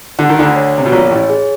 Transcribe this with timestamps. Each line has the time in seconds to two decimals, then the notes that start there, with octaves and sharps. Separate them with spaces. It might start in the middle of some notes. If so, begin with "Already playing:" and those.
0.19 D3 F#5
0.29 D#3
0.39 D2 D3
0.56 C#5
0.78 C3
0.85 B2
0.92 A#1 A#2 C#5
1.04 A#2
1.11 A1 A2
1.30 G#4